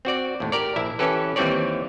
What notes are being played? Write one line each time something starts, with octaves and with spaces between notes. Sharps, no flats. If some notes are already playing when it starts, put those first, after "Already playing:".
C4 F#4 D5
D#2 A2
G4 A#4 D5
A#1 E4 E5
E3 C#4 G4 A4 B4
D#2 E3 G3 C4 C#5 D5